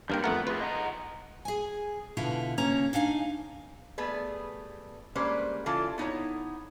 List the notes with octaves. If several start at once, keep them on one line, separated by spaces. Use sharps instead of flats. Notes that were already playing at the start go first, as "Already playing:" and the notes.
G2 D3 A#3 A#4 G5
F2 A3 A#4 B4 F#5
F4 G#4 B4
D#5 F#5 A#5
G#4 G#5
B2 D3 E4 F4 B4
D#2 C#3 A#3 C#4 A#5
D4 D#4 F5 G5 G#5
G3 A3 B3 G#4 B4
G3 G#3 A#3 C#4 B4 C5
C#3 E3 F4 A4
B3 D#4 E4 C#5